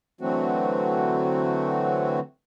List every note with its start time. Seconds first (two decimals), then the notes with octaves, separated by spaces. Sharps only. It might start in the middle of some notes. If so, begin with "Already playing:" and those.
0.21 D3 E3 F#3 A3 C4 F#4